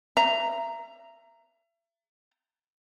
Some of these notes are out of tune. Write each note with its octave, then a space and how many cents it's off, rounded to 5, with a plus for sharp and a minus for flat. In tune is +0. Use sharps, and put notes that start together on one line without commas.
E5 +35 A#5 -5